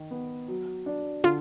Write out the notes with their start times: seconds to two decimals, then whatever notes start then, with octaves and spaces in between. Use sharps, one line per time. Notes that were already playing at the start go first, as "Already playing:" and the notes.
Already playing: D#3
0.11 B3
0.48 F#3
0.86 D4
1.24 D3 F4